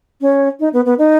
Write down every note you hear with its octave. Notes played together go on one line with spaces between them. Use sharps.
C#4
D#4
B3
B3
D#4